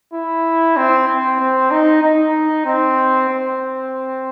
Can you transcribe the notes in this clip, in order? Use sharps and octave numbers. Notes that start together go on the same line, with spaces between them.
E4
C4
C4
C4
D#4
D#4
C4
C4